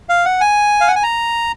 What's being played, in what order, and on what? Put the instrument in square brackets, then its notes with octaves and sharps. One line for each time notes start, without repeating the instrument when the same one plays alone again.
[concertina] F5
F#5
G#5
F5
F#5
G#5
A#5